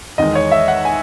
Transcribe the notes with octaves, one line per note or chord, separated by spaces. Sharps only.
E2 D#3 G#3 D#5
C#5
E5
F#5
G#5